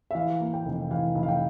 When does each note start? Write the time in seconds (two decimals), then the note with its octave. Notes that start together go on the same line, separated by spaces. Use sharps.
0.11 E5
0.15 E3 F5
0.40 A#3
0.53 G5
0.65 F1
0.91 E3 F5
1.15 F1
1.23 F5
1.28 G5